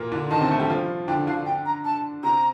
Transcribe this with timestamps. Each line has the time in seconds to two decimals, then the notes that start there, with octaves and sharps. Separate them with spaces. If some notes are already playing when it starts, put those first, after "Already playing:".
Already playing: A#2 A#3
0.12 D3 D4
0.31 D#3 D#4 A5
0.41 C3 C4
0.51 A3 A4
0.60 G3 G4
0.70 F3 F4
1.08 D3 D4 G5
1.27 D3 D4 F5
1.46 G5
1.66 A#5
1.85 A5
2.23 C3 C4 A#5